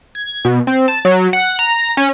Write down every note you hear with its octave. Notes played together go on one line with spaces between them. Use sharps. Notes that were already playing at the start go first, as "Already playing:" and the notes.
G#6
B2
C4
A5
F#3
F#5
A#5
C#4